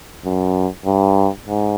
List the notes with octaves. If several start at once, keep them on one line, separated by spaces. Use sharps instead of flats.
F#2
G2
G#2